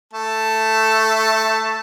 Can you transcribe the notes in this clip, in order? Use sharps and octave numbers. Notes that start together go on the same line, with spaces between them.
A3 A5